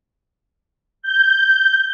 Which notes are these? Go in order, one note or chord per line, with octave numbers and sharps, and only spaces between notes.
G6